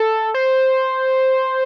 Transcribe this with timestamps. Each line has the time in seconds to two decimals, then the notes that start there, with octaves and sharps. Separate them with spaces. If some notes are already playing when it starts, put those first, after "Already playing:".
Already playing: A4
0.34 C5